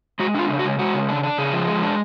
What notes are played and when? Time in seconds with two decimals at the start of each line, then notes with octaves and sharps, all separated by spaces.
0.19 G#3 F#4
0.35 D4 F4
0.50 C#3
0.59 F#4
0.65 G#3
0.79 G#3 F#4
0.94 C#3
1.09 D4
1.23 D4
1.38 C#3 G#4
1.53 F3
1.68 G#3
1.83 D4